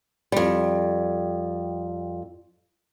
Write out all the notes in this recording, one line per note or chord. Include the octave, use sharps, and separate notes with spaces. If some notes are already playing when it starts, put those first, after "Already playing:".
F2 G3